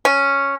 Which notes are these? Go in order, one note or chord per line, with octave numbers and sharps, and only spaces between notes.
C#4